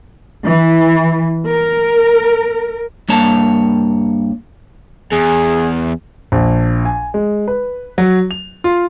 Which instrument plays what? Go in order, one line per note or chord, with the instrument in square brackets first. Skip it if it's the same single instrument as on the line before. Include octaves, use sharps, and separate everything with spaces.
[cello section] E3
A#4
[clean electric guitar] G2 A#3 C#5 A5
[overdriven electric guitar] E2 [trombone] G#4
[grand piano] A#1
G#5
G#3
B4
F#3
F7
F4